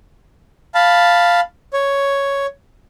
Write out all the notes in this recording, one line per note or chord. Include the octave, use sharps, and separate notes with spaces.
F5 A5 B5
C#5